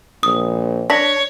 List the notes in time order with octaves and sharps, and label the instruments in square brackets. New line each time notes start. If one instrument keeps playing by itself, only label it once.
[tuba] A#1 [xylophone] D#6
[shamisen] D4 [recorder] C#5 [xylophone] A#6 B6